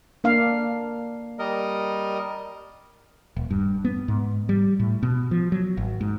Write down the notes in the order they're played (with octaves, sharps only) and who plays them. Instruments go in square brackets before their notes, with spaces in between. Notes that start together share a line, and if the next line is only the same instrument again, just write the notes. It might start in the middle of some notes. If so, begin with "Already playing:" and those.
[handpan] A#3 D4 F5
[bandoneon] G3 A#4 D#5
[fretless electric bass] D#1
G2
B3
G#2
G3
A2
B2
F3
F#3
G#1
G#2